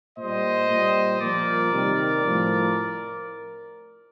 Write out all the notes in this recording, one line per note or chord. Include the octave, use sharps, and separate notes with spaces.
A#2 G3 C5 D#5
A#2 G3
A#2 F3 A#4 D5
C3 D#3 G3
A2 F3